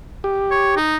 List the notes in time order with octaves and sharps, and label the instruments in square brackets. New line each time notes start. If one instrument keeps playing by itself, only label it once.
[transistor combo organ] G4
[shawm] C#5
D#4